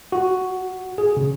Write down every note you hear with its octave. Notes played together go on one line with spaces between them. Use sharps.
F#4
G#4
C#3